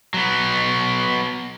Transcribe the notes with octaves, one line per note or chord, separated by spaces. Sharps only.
F#3 B3